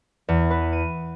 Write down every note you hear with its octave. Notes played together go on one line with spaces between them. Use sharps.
E2
B4
D#7